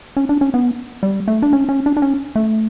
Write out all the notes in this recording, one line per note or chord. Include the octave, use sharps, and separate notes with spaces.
C#4
D4
C#4
B3
G3
A3
D4
C#4
C#4
D4
D4
C#4
A3